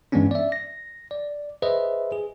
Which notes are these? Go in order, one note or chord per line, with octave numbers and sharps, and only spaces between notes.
G2 E3 G#3 B3 C#4 D4
D5 E5
A#6
D5
G#4 B4 C5 D#5 E5
G#4